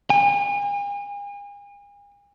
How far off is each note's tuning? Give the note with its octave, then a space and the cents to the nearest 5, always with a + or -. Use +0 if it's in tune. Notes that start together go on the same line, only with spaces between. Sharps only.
G#5 -40